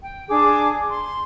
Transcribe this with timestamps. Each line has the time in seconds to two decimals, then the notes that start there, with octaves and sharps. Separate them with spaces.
0.02 G5
0.30 D4 G#4 D6
0.92 C6